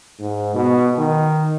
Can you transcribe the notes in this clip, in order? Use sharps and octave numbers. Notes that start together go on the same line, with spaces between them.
G#2
B2
D#3